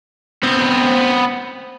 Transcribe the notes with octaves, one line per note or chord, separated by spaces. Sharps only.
B3 C4